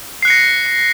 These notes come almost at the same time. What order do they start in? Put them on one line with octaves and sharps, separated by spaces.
C7 F#6 C#7 A#6